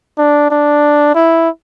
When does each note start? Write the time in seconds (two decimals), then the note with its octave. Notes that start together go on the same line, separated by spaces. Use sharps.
0.18 D4
0.51 D4
1.15 E4